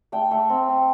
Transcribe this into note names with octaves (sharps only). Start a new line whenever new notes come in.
A3 G5
A3
C4
C4